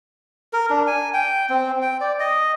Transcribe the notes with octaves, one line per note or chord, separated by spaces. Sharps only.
A#4
D4
G#5
G5
C4
G5
D5
D#5